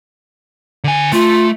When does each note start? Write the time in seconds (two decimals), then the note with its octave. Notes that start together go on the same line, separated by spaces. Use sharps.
0.84 D3 G#5
1.12 A3 F4